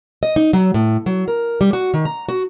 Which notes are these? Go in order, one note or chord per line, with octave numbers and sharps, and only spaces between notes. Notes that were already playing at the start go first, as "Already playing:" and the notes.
D#5
D#4
F#3
A2
F#3
A#4
G3
F#4
D#3
A#5
F#4